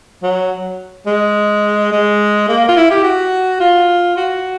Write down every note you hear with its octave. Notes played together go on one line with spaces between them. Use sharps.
F#3
G#3
G#3
A#3
F4
E4
G4
F#4
F4
F#4